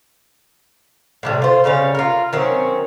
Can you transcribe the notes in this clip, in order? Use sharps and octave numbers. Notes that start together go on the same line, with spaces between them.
A2 C3 G3
F4 C5
C#3 G3 C#4 F5
F4 A#4
D#3 F#3 C4 C#4